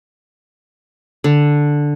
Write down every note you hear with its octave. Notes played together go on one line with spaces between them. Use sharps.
D3